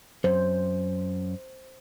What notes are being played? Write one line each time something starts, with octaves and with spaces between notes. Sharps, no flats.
F#2 C5